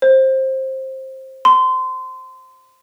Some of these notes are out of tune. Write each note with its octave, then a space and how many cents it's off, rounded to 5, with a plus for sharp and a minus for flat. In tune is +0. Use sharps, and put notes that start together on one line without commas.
C5 +15
C6 -25